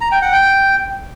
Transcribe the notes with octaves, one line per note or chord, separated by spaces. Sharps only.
A#5
G5
F#5
G5